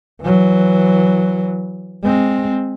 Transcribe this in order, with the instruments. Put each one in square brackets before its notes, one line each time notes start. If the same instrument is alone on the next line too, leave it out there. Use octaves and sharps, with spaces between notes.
[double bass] E3 F#3
G#3 C4